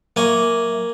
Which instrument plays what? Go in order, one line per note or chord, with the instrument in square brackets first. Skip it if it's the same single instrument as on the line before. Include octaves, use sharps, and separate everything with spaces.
[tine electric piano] F#3 E5 C#6 [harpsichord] A#3 G#5